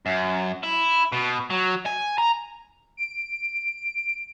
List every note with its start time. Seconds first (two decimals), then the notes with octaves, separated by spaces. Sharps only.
0.06 F#2
0.63 E4
1.12 B2
1.50 F#3
1.86 G#5
2.18 A#5
2.97 D7